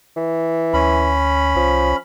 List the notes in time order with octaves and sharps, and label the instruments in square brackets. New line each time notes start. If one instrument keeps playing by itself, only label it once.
[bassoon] E3
[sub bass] D2 [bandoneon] C#4 B5
[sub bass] C2 [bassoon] F3